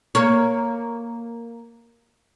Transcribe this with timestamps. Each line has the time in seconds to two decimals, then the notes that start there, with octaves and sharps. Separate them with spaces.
0.15 A#3 C#5